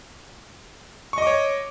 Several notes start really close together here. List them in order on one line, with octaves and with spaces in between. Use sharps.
C#6 D#5 D6 C#5